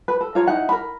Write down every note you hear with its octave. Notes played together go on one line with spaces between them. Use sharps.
B4
A4
F4 C#5 A#5
D#4 E4 F#5
A#4 B5